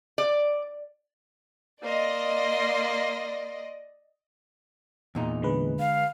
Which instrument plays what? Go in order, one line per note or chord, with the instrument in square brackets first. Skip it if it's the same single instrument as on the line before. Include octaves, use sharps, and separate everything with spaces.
[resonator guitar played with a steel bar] D5
[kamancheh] A#3 C6 [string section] D5 D#5
[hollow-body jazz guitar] E2 A#2 D#4
[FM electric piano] D3 G#3 B4
[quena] F5